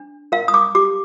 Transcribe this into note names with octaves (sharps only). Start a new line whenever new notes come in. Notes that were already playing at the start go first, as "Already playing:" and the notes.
Already playing: D4
A#4 F5
D#6
D6
G4 D6